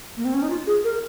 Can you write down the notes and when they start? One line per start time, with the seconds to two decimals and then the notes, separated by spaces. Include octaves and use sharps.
0.17 A#3
0.25 C4
0.34 C#4
0.42 D#4
0.50 F4
0.67 G#4
0.84 A#4